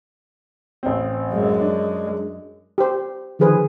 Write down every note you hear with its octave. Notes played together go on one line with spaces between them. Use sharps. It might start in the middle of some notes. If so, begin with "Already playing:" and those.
A1 C4
F#2 G#3
D4
G4 C5
D3 D#3 F3 G#4 B4 C5